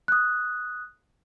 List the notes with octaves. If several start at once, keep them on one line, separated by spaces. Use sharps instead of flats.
D#6 F#6